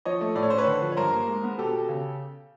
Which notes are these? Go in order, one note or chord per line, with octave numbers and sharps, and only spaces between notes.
F3 C#5 D#5
A3
A2 D5
C#5
C#4 C5
B4 C#5
D3
F3
C#5
G2 A#4 C5
A#3
G#3
B3
B2 G4 A4
B2
C#3